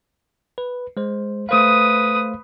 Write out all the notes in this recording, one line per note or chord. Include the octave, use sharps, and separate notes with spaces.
B4
G#3 C5
A3 B4 C5 F5 D#6